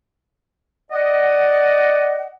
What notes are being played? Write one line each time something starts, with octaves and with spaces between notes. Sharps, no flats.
D5 D#5 F#5